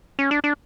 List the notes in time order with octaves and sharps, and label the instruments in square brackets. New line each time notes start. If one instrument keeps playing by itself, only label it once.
[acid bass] C#4
D4
D4